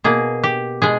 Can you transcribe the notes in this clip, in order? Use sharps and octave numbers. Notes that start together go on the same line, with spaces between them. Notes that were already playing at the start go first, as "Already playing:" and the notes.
B2 A#3 G#4
G4
B2 G#3 G#4